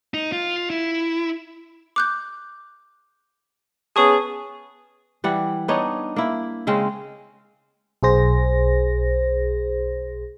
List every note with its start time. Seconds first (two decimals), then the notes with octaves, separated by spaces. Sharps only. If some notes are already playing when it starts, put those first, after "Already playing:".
0.14 D#4
0.32 F4
0.70 E4
1.96 D6 F#6 G6
3.96 B3 C#4 G#4 A5 C#6 D#6
5.24 E3 G3 F#5
5.68 B3 D4 D#4 C#5
6.16 A#3 E4
6.67 C#3 G#3 C4 C#4
8.03 B1 G#4 C5 A#6